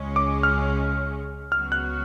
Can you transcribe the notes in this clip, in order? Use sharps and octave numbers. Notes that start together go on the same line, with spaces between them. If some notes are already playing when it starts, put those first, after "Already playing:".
Already playing: C#2 C#3 G#3 C#4
D6
F6
C#2 C#3 F#3 B3 F#4 F6
F#6